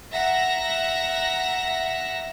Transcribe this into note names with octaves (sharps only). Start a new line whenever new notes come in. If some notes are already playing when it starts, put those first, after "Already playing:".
E5 F#5 A#5 A#6